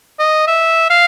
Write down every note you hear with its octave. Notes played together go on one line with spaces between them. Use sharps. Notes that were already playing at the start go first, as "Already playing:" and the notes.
D#5
E5
F5